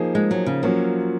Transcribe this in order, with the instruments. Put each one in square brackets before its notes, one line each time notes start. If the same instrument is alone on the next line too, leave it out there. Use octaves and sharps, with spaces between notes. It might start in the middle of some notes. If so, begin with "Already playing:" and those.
Already playing: [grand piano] F3 A#3 D#4 G#4
[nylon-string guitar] G#3
F#3
C#3
[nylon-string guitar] F3 [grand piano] F#3 A#3 C#4